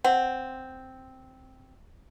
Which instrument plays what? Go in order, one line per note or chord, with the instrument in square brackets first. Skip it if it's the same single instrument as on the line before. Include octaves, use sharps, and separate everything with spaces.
[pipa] C4 [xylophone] F#5